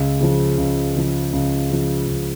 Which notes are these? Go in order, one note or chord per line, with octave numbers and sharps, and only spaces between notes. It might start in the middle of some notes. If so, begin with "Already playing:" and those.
Already playing: C#2
C#3 F3
C#2
C#3 F3
C#2
C#3 F3
C#2